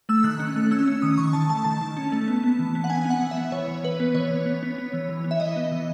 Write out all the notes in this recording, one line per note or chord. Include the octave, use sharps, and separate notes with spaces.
A3 E6
D#3 F#6
C#4 F#6
A3
C#4 E6
C#4
D#3 D#6
D#3 C#6
D#3 A5
A3 A5
D#3 A5
D#3
C#4
A3
B3
B3
E3
B3
F#5
B3 G#5
B3
F#5
E3
E5
B3
E3 C#5
E3
E3 B4
B3
E3 C#5
B3
B3
B3
B3
E3
E3
B3
E5
E3 D#5
B3
E3